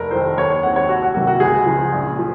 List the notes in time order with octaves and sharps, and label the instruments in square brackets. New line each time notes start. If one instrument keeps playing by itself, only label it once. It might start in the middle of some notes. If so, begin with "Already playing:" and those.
Already playing: [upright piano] F1 A#4
F2 D#3 C5
D#2 C#5
C#5
D#3 G#3 C4 F#5
C#5
C2 F#4
F#4
C3 D#3 A#3 F#4
F#4
C#2 G#4
C#3 F3
A#1
F3